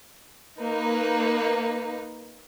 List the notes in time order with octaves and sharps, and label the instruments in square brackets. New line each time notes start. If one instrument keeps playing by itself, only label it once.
[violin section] A#3 D#4 B4